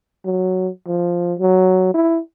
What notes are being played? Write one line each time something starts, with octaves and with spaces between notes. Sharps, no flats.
F#3
F3
F#3
E4